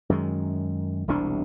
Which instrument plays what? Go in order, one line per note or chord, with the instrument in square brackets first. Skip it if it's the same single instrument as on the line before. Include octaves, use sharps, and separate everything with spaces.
[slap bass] F#2 D#3 G#3
E1 C2 C3 D4